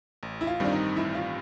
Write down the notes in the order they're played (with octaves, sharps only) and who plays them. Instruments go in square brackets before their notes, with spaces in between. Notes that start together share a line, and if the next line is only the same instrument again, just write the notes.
[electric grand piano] A1
[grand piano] E4
F4
[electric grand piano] G2 D#3 G3 C4 [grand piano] D4
[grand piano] D#4
[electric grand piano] A1 [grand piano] E4
[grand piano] F4